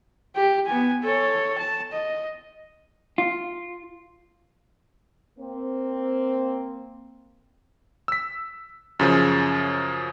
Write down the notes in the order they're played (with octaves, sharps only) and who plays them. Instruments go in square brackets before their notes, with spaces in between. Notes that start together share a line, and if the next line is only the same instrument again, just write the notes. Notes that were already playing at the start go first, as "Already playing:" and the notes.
[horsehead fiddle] G4
B3 G#5
A4 C#5
A5
D#5
[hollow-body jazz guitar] F4
[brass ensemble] A#3 C4
[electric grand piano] E6 B6
F#2 C#3 F3